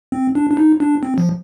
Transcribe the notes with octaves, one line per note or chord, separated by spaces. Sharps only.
C4
D4
D4
D#4
D4
C4
F3